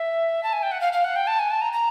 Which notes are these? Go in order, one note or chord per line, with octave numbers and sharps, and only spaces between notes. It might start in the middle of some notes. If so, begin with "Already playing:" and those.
Already playing: E5
A5
G#5
G5
F#5
F5
F5
F#5
G5
A5
G#5
A5
A#5
A#5